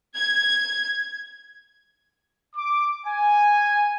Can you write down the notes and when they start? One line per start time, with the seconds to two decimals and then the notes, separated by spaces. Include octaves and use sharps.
0.17 G#6
2.55 D6
3.05 G#5